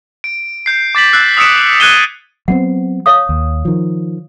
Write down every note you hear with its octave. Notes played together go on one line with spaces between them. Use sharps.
D7
G6 C7
D6 A6 B6 F#7
E6 F#6 C7
D#6 E6 B6 C#7 D7 E7
F#6 G#6 B6 D#7 E7 G7
F#3 B3 C4 F#5
C#5 F5 D#6
D#2
D#3 F3